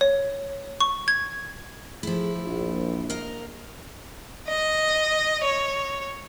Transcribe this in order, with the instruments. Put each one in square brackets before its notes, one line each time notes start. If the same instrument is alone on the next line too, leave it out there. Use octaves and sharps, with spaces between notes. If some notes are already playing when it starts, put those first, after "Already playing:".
[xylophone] C#5
C#6
G#6
[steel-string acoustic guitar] F3 E4 [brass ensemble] A3 G#4
[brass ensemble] A#1
[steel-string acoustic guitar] A#4 D#5 F5
[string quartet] D#5
C#5